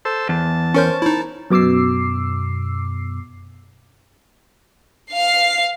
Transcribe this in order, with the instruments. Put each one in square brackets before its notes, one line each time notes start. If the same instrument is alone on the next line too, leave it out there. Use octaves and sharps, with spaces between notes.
[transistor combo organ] A4 C5 E6
[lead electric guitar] E2 [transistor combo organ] A5
[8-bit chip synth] C#4 A#4 G6 [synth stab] C5 C#5 C#6
[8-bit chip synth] D#4 E4
[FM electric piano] F#2 B2 D6 E6 C7
[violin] F5 C7